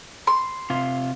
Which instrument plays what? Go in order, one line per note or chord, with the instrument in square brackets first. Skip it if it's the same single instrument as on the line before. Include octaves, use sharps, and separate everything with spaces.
[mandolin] C6
[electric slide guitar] C3 F4